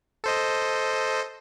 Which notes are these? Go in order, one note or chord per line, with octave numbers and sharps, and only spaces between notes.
A4 C5 D#5